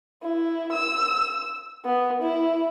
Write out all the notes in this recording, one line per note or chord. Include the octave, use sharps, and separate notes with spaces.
E4
E6
B3
E4